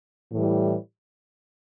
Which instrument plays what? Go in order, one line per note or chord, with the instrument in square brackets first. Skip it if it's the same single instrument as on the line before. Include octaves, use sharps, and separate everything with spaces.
[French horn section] A2 E3 G3